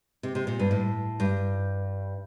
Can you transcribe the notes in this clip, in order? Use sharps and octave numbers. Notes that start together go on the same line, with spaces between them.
C3
C3
A#2
G2
A2
G2